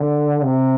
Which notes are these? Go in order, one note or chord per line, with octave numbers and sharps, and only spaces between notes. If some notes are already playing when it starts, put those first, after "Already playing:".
Already playing: D3
C3